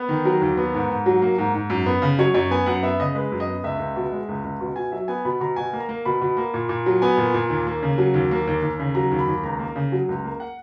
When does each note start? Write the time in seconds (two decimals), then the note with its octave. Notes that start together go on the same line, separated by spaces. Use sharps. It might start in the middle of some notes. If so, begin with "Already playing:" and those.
Already playing: B3
0.09 D#3
0.25 F#3 A#4
0.42 D#2
0.57 B3
0.74 G#2
0.90 G#2
1.06 F#3
1.22 A#3
1.38 G#2
1.54 G#2
1.70 F#2
1.86 B3
2.02 C#3
2.18 F#3 C#5
2.34 F#2 C#5
2.51 B3 G#5
2.66 F#2 F#5
2.83 B3 E5
3.00 C#3 D#5
3.15 G#3 B4
3.32 F#2
3.40 D#5
3.47 B3
3.63 C#2 E5
3.79 C#2
3.96 B2
4.12 G#3
4.29 C#2
4.44 C#2
4.60 B2
4.76 B2 G#5
4.92 F#3 E5
5.08 B3 G#5
5.25 B2 B5
5.41 B2 A#5
5.56 B2 G#5
5.73 A#3
5.80 A#5
5.89 A#3
6.05 B2 B5
6.21 B2
6.37 A#3
6.54 A#2
6.69 A#2
6.86 F#3
7.02 B3 G#5
7.17 A#2
7.34 A#2
7.50 D#2
7.67 A#3
7.83 C#3
7.98 F#3
8.14 D#2
8.31 A#3
8.47 D#2
8.62 D#2
8.79 C#3
8.95 F#3 A#5
9.11 D#2
9.19 B5
9.28 D#2
9.43 C#2 A#5
9.59 A#3
9.76 C#3
9.92 F#3
10.09 C#2
10.24 A#3
10.40 F#5